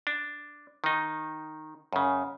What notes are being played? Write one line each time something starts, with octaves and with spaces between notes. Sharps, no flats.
D4
D#3 D#4
F#2 C#3